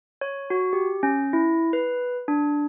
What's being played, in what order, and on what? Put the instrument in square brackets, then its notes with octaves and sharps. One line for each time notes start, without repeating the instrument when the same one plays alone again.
[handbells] C#5
F#4
G4
C#4
E4
B4
D4